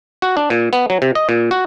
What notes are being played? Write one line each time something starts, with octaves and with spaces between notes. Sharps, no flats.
F#4
D4
A#2
B3
F#3
C3
D#5
A#2
F#4